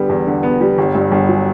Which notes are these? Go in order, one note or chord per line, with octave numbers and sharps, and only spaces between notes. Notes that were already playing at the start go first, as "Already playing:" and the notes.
Already playing: D3 G3 B3
E2
D3
B3
G3
G1
G2
G1
F#3